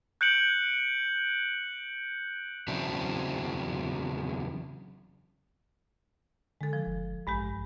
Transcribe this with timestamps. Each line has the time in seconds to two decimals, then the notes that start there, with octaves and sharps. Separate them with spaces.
0.21 F#6 G6 C#7 D7 F#7
2.68 E2 C#3 F#3 C4 D4 E4
6.61 D3 G#3 A4
6.73 F3
6.86 F#1
7.27 A1 G2 G#3 G4